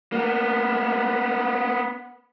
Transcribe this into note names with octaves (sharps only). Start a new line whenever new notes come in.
A#3 B3